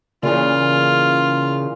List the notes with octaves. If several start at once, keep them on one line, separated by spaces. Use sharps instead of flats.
A#2 C#3 E3 F4